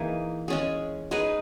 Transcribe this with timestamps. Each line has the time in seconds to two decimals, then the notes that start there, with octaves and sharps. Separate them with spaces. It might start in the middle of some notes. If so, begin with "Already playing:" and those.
Already playing: E3 A#3 D#4 G#4
0.48 G#3 C#4 G#4
1.11 G#3 D#4 G#4 B4